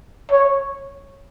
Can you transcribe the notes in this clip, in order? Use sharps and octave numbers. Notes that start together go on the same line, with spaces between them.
C#5